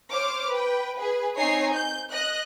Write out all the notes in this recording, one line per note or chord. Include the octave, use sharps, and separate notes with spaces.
C5 C#5 D6 F6
B4 G5
G#4 B4
C4 D#4 C#5 G#5 C7
G6
D#5 F#6